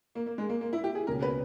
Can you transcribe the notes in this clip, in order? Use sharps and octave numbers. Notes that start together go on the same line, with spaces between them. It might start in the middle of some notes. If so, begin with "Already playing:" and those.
A#3
A#3
G#3
A#3
A#3
E4
G4
G#4
C#2 B2 A#3 C#4 A#4
B4